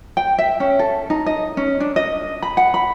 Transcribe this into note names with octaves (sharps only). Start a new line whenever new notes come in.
G5
E5
C#4
A4
D#4
D#5
C#4
D4
D#5
B5
F#5
B5